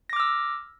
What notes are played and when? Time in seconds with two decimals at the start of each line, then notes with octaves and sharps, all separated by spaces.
0.10 A#6
0.13 D6
0.16 F6
0.20 E6